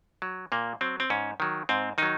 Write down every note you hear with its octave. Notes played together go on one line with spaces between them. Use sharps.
F#3
A#2 A#3
F#3 C4
C4
G#2 C#4
D#3 F#3
G#2 C4
D#3 F#3 D#4